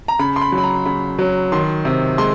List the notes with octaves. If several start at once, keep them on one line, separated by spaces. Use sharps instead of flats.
A#5
C#3 B5
C6
B5
F#3
B5
A#5
C#3 B5
F#3
D#3 C6
C3
G#3 C6